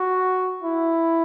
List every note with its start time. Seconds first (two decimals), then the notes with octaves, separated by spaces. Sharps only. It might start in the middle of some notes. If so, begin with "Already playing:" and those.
Already playing: F#4
0.62 E4